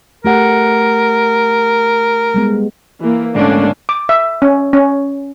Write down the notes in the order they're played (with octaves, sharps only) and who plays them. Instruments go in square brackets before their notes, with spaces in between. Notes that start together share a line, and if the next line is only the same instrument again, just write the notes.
[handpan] A3 G4 F#5 [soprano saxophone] A#4
[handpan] G3 G#3 B3
[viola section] E3 A#3
[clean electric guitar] D2 G#2 A#3 [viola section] D3 C#4 D4
[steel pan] D6
E5
C#4
C#4